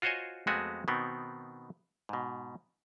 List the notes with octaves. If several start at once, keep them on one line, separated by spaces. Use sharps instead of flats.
F4 F#4 C5 C#5 D#5 G#5
F2 G#3 A3 B3 F#4 G#5
B2 D#3 B3 C4
G#2 B2